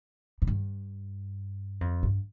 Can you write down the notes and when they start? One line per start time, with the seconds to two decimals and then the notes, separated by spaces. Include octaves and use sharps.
0.42 A2
0.47 G2
1.81 F2
2.03 G2